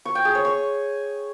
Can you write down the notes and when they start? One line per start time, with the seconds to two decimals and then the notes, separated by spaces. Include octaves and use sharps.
0.05 C#6
0.15 G5
0.25 G#4
0.35 C#5
0.45 C#6